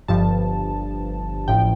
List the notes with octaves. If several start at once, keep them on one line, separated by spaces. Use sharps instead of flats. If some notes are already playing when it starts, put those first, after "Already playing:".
G1 G2 F3 A5
A1 A2 F3 G5